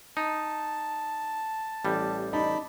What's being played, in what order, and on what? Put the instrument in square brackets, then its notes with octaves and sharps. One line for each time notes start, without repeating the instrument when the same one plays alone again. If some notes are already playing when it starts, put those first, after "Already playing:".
[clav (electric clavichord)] D#4 [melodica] A5
[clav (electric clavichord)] A1 G3
[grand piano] D#4 [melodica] D5 A5 B5